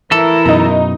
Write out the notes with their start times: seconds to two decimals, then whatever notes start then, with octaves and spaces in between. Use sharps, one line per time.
0.11 E3 E4 A4 A#4
0.46 F#2 B2 D#4 A#5